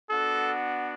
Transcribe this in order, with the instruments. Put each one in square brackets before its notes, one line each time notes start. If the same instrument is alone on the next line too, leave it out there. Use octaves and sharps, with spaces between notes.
[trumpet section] B3 D4 F#4 A4